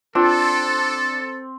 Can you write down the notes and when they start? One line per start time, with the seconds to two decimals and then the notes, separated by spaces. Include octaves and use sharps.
0.15 C4 D4 F4 A4